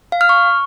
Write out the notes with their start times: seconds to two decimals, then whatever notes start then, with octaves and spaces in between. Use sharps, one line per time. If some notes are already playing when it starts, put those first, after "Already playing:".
0.12 F5
0.21 F6
0.29 C#6